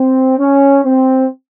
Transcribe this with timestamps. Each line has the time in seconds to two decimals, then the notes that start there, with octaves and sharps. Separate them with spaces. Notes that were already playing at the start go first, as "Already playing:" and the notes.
Already playing: C4
0.39 C#4
0.85 C4